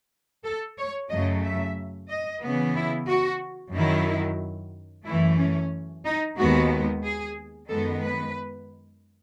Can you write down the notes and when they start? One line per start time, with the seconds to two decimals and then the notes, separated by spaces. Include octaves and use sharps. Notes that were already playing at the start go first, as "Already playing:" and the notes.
0.44 A4
0.77 C#5
1.10 F#2 C#3 F#3 A3 D#5
1.42 E5
2.09 D#5
2.41 C#3 E3 B3
2.74 E4
3.08 F#4
3.73 F#2 D#3 F#3 E4
5.05 F#2 E3 A3 E4
5.38 C#4
6.05 D#4
6.37 D#2 D#3 G#3 B3 F#4
7.03 G#4
7.69 F#2 D#3 G#3 B3 A4
8.02 B4